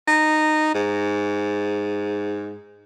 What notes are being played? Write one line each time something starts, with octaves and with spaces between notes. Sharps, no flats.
D#4
G#2